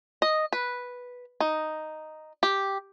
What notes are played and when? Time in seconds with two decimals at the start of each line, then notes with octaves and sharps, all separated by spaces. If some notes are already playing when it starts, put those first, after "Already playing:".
0.22 D#5
0.53 B4
1.40 D#4
2.43 G4